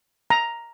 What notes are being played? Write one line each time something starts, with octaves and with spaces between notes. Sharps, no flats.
A#5